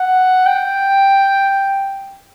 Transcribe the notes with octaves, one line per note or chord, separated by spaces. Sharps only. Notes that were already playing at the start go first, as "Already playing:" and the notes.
Already playing: F#5
G5